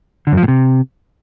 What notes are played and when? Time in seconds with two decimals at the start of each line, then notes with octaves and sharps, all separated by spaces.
0.27 D3
0.32 F#2
0.37 F3
0.43 A2
0.48 C3